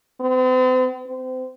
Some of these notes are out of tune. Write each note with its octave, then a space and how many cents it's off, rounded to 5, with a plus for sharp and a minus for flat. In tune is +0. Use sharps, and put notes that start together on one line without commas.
C4 -40
C4 -30